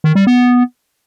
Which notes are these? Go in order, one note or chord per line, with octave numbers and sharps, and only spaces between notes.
D#3
G3
B3